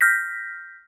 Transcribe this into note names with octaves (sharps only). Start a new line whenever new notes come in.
F6 G6 A#6 B6